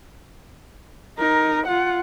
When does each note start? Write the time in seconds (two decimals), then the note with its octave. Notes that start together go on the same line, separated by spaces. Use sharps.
1.18 D#4 A#4
1.67 F4 F#5